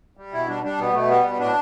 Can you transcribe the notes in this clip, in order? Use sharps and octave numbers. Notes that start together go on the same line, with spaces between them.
G3
B2 E4
G3 D4
G3 D4
B2 B3
B2 A3
G3 B3
B2
A2 D4